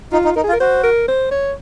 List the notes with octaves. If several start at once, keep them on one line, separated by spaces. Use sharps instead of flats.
D#4 F4
D#4
D#4 A#4
G#4
F4
A#4
F#4 C5
A#4
C5
C#5